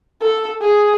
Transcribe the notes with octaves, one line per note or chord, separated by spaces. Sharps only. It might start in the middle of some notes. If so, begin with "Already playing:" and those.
A4
G#4